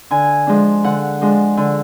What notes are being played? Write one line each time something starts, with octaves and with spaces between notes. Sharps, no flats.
D3 G#5
F3 G#3 D4
D3 F#5
F3 G#3 D4
D3